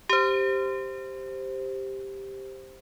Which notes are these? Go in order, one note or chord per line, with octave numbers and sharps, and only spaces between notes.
G4 C5